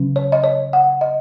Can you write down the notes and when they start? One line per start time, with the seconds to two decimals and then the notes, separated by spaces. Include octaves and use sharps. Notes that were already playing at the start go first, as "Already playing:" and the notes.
Already playing: C#3 F#3 C#4
0.16 C#5
0.32 D#5
0.44 C#5
0.73 F#5
1.01 D#5